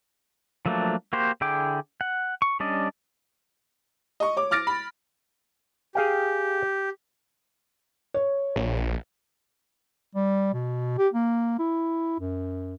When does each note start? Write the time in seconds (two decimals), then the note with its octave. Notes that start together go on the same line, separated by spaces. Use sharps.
0.66 F3 F#3 A3 A#3 D4
1.13 A#3 F#4 G4 C5
1.41 D3 E4 G#4 G5 D6
2.01 F#5
2.42 C#6
2.60 G3 C#4 D4 D5 D#5
4.20 D#5 C#6
4.37 C#5 D6
4.51 D6 F6 A6 A#6 D7
4.67 B5
5.95 G4 G#4 F5 G5
8.14 C#5
8.56 A#1
10.15 G3
10.53 B2
10.98 G4
11.14 A#3
11.59 E4
12.20 F#2